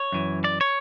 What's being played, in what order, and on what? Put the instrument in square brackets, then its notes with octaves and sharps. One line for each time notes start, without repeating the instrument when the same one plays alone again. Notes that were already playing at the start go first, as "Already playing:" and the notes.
Already playing: [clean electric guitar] C#5
F#2 E3
D5
C#5